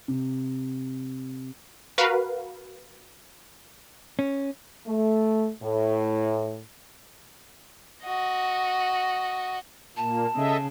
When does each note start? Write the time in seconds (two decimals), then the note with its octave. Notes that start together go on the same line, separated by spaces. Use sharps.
0.08 C3
1.98 F#4 A#4 B4 F5
4.19 C#4
4.87 A3
5.63 A2
8.04 F#4 D#5
9.96 A#2 A#3 A5
10.36 C#3 A4 D#5 E5